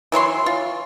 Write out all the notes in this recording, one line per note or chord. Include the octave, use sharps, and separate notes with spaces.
E3 F#3 C#5 C6
F4